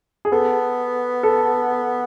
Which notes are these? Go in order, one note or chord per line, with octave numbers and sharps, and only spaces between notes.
G#4
B3 A4
A4